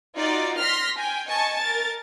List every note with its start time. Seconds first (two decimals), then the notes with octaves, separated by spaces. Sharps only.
0.16 D#4 F4 F#4 D5
0.59 C6 F6 A#6 B6
0.98 G5 G#5
1.29 D#5 G#5 A5 C#6
1.59 A#4 A6